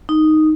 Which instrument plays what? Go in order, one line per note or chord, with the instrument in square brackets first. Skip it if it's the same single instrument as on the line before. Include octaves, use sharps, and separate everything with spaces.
[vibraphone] D#4